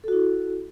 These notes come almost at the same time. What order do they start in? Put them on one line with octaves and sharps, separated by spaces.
A4 F#4 E4